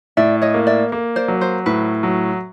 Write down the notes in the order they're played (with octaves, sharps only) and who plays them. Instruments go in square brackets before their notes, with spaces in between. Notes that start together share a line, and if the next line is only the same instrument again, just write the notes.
[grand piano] A2 [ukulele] D5 E5
[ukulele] C#5 D#5
[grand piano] A#3
[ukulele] D5 E5
[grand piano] A#3
[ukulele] C5 D5
[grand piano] F#3
[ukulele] C5
[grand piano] A2 [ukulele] B4
[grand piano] F#3